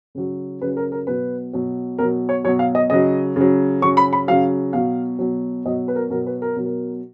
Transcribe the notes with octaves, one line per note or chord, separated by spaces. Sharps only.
C#3 F#3
C#3 F#3 B4
A#4
A#4
B2 F#3 B4
B2 F#3
B2 F#3 A#4
C#5
B2 F#3 C#5
F5
D#5
C#3 F#3 D#5
C#3 F#3
C#3 F#3 C#6
B5
B5
C#3 F#3 F5
B2 F#3 F5
B2 F#3
B2 F#3 D#5
B4
A#4
B2 F#3 A#4
B4
A#4
B2 F#3
A#4